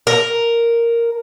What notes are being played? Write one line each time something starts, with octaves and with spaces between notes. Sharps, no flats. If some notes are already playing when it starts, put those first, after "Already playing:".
A#4